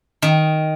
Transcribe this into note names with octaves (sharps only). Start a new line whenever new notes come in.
D#3